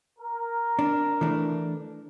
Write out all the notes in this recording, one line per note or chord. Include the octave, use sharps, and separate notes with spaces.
A#4
D4
E3 A3 D4